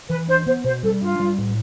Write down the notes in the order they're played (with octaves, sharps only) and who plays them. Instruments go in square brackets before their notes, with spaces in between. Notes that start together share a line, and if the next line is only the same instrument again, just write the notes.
[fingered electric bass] E3 [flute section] B4
[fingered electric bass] D4 [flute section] C5
[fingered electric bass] B3 [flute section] C5
[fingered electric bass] B2 [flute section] C5
[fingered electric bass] G3 [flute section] A4
[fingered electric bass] D4 [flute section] F4
[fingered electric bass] G3
A2